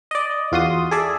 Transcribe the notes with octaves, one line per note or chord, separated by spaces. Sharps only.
D5 D#5
E2 F4 F#4 C6 D#6
G#4 A4 D5 E5